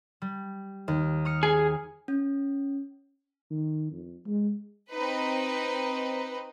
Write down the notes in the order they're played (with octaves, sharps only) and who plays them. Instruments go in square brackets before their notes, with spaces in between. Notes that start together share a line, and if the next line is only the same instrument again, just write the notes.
[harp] G3
D#2
D#6 F6 C#7
[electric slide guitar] G#4
[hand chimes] C#4
[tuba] D#3
F2
G#3
[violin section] C4 D#4 B4